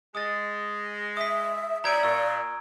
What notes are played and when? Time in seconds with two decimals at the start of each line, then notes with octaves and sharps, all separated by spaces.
0.15 G#3 D#6 A6
1.17 E5 D#6 B6
1.84 G3 C#4 E4 D5 A#5 G#6 D7
2.03 A#2 C#6 E6